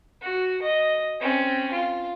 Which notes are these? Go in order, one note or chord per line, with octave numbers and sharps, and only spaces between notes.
F#4
D#5
C4 C#4
F4